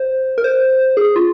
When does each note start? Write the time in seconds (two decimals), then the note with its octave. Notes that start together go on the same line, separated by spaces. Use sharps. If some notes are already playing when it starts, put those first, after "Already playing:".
Already playing: C5
0.38 A#4
0.44 C5
0.97 G#4
1.16 F4